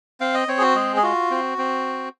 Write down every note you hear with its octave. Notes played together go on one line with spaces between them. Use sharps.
C4 F5
D#5
C4 C#5
G#4
F#4
G#3 G#4
G#4
F4 F#4
C4
C4